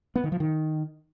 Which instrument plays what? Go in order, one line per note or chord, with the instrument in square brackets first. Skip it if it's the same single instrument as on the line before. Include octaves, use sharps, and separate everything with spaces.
[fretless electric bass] B3
D#3
F3
D#3